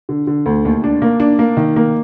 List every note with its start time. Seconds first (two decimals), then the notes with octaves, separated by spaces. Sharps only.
0.09 D3
0.27 D3
0.46 D2
0.65 D#2
0.84 D4
1.02 A#3
1.20 D4
1.39 A#3
1.57 D#3
1.76 A#3